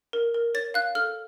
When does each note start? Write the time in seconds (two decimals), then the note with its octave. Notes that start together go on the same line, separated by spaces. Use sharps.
0.13 A#4
0.34 A#4
0.55 C#5 A6
0.74 F5 F#6
0.95 A4 F6